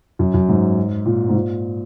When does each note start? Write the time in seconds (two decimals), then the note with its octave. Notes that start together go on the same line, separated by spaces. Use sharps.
0.19 F#2
0.34 F#2
0.49 G#2
1.06 A#2
1.29 G#2
1.34 A#2